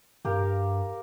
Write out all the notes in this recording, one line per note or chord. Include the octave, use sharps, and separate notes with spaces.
G2 G4 A#4 F5